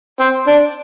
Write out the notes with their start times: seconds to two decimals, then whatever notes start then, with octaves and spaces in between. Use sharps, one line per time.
0.20 C4
0.47 D4